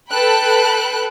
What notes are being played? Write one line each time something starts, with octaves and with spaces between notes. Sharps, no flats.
A4 B4 G5 B5 F#6